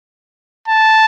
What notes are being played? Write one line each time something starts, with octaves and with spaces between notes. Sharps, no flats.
A5